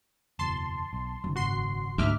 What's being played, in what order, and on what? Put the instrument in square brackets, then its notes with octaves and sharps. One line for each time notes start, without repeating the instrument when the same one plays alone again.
[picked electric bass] F#1 E2 B2 [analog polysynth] A5 C6
[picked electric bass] B1
[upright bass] F#1 [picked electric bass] D#3 F#3
[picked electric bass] G#1 [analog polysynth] F#4 C6 C7
[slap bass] D2 [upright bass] G#2 [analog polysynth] E5 D6 F6